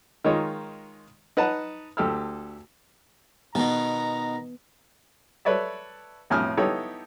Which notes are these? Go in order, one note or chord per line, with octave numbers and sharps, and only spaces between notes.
D#3 G#3 D#4 F4 C#5 D#5
D#4 B4 F#5 A5
D2 G4 A4 E6 F6
B2 D#3 B3 A5 A#5
A4 B4 C#5 D5 E5
B1 F2 A2 G#5 D#6 F6
B3 D#4 E4 G4 A4 C#5